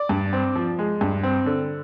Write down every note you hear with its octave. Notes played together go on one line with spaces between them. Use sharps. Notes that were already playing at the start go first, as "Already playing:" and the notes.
Already playing: D5
G2
C4
F3
G#3
G2
C4
D3